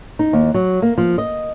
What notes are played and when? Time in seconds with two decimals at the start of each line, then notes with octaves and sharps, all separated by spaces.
0.19 D#4
0.33 D#2
0.54 F#3
0.82 A#3
0.98 F3
1.18 D#5